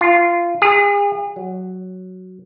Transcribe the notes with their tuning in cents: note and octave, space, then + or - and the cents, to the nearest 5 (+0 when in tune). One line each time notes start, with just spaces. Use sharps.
F4 -15
G#4 -40
F#3 +0